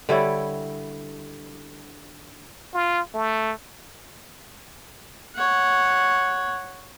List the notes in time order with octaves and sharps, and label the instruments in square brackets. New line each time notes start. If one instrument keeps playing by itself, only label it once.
[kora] D3 G3 E4 C#5
[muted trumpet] F4
A3
[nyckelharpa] C#5 F#5